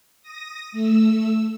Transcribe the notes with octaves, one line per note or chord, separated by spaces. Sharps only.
D#6 A#6
A3 E6